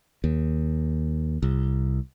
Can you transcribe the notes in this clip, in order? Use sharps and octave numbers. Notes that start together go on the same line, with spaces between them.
D#2
C2